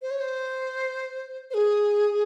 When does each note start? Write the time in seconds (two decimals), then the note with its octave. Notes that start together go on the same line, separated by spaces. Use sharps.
0.02 C5
0.11 C#5
0.20 C5
1.50 C5
1.54 G#4